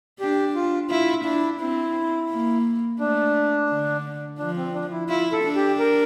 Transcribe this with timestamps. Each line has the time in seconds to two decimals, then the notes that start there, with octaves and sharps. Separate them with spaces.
0.20 D4 G4
0.55 F4
0.90 E4 F4
1.24 D4 E4
1.60 C4 E4
2.30 A#3
2.99 A3 D4
3.69 D3
4.39 F3 D4
4.57 C4
4.74 D4
4.91 E4
5.08 E4 F4
5.32 A4
5.44 D4
5.55 G4
5.79 A#4